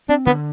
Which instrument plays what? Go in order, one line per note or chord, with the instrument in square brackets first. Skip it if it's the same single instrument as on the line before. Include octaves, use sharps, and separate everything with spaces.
[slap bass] C4 [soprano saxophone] D4
[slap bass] D3 [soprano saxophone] B3